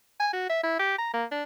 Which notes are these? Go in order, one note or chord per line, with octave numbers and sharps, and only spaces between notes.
G#5
F#4
E5
E4
G4
A#5
A#3
D4